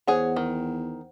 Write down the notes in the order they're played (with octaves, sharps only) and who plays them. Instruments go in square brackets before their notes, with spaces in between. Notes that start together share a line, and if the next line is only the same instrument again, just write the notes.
[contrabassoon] E2 [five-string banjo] G#4 C#5 [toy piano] C5 F#5
[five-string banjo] D#3